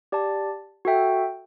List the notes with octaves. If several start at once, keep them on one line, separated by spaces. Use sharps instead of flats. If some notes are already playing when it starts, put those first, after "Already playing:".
G4 D5 A5
F#4 A4 E5 G5